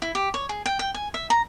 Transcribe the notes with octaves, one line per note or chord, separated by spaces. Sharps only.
E4
G4
C#5
G#4
G5
G5
G#5
E5
A#5